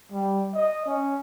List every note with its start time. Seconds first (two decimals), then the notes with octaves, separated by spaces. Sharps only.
0.12 G3
0.54 D#5
0.86 C#4